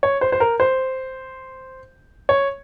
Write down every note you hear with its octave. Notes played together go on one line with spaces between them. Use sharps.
C#5
C5
C5
A#4
C5
C#5